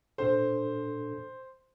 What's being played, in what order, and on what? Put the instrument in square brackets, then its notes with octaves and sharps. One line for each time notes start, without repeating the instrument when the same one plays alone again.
[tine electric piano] A#2 D4 A4 [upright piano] C5